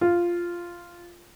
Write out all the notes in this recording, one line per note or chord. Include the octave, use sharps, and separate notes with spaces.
F4